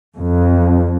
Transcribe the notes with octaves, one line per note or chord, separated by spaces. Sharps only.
F2